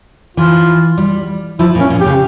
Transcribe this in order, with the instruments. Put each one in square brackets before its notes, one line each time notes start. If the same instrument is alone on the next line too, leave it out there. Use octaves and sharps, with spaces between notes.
[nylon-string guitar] E3 [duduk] F4
[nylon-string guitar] G3
[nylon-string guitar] F3 [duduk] E4
[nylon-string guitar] A#2
[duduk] C#4
[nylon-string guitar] A#2
[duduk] G4
[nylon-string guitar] C#3